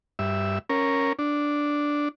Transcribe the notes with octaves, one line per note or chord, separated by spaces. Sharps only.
G2 E5
C#4 A#4
D4